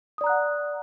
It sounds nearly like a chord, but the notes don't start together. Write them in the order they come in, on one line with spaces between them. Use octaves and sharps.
D#6 D5 A#5 F#6 F#5